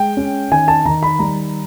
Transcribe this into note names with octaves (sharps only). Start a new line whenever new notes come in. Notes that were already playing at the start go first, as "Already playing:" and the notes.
Already playing: G#3 G5
C#4
D#3 G#5
A5
D#3 A#5
B5
G3 A#5